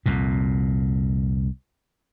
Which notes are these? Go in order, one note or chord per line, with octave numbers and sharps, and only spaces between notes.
C2 F2 A#2